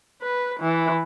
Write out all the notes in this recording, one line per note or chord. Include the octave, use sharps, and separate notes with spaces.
B4
E3